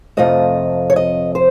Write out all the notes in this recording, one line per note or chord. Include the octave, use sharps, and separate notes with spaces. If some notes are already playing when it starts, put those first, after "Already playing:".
F2 C3 F3 A3 D#5
C#5
D#5
C5